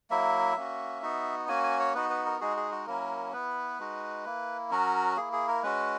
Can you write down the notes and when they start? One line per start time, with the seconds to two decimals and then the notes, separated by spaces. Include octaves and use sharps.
0.10 F#3 A#3 E4 E5
0.56 A#3 C#4 F#4
1.02 B3 D#4 F#4
1.48 A#3 C#4 F#4 G#5
1.63 G#5
1.79 C#5
1.94 B3 D#4 F#4 B4
2.10 B4
2.26 A#4
2.41 G#3 D#4 F#4 G#4
2.57 G#4
2.71 F#4
2.87 F#3 A#3 C#4 E4 A#4
3.33 B3 E4 B4
3.79 G#3 D#4 F#4
4.25 A#3 E4
4.71 F#3 C#4 F#4 A#4
5.17 A#3 E4 G#4
5.33 G#4
5.48 A#4
5.63 G#3 C#4 F#4 B4